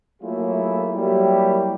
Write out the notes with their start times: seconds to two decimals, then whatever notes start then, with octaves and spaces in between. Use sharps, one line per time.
0.22 F#3 A3 A#3 E4 F4 G#4
0.93 F#3 G3 A#3 E4 G4